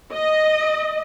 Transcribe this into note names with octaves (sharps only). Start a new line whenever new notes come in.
D#5